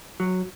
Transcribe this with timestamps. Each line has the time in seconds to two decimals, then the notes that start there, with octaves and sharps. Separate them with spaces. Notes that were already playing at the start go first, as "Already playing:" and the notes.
0.20 F#3